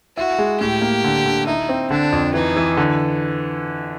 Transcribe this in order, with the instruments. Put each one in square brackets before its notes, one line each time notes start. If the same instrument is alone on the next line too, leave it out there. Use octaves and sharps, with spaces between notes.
[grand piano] E4 [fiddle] F#4
[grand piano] G#3
[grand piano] A2 [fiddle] G4
[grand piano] A#3
D3
D3
[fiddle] D#4 [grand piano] E4
[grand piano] C4
[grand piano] D3 [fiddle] D4
[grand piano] F2
[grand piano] E3 [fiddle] D#4
[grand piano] E3
D3